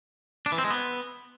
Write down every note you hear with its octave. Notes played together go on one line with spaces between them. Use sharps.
D4
E3
C4
G#3
B3